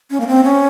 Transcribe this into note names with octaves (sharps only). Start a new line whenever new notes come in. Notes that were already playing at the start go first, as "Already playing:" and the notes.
C#4
A#3
C4
C#4